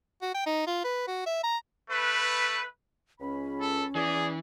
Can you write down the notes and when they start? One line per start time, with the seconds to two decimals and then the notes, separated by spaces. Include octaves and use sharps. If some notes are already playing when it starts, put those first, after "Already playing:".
0.22 F#4
0.35 G5
0.46 D#4
0.67 F4
0.84 B4
1.08 F#4
1.26 E5
1.44 A#5
1.90 A3 B4
3.21 C#2 C#4 B5
3.61 A4
3.95 E2 E3 G#4 B4 D5